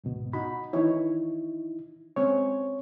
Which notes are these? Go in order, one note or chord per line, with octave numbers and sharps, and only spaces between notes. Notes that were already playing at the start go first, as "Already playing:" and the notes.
D2 G#2 B2
D#4 F#4 B5
D#3 E3 D#4 E4 C#5
G#3 C4 C#4 C#5